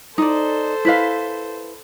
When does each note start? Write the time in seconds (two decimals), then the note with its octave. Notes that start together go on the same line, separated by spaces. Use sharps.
0.18 D#4 A4 C5 D5
0.85 E4 B4 F5